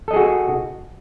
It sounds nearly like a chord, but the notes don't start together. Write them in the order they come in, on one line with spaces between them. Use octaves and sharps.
A4 D#5 G#4 F#4